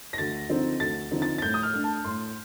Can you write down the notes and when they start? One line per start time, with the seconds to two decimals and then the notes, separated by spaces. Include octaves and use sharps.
0.13 A#6
0.18 D2 A6
0.49 D3 F3 C4 D#4
0.80 D2 A6
1.11 D3 F3 C4 D#4
1.22 A6
1.38 A6
1.42 A2 G6
1.54 D#6
1.63 F6
1.73 A3 D4
1.84 A5
2.04 A2 C6